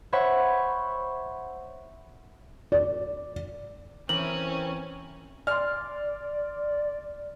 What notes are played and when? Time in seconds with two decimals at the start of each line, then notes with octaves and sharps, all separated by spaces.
0.12 C5 C#5 E5 F#5 B5 C#6
2.72 D5
4.09 E3 C4 C#4 A#4 F#7
5.47 D5 C6 F6